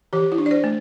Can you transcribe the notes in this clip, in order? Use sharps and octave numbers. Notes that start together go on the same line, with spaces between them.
E3 G4
E4
D4
D5
C5
A3